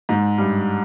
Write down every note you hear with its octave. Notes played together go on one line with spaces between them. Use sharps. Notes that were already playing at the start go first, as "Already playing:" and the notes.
G#2
G2